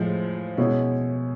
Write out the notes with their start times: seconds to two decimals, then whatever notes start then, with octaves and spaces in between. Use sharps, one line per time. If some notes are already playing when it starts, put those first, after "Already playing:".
Already playing: A2 F3 G#3
0.57 B2 G#3 C#4 E4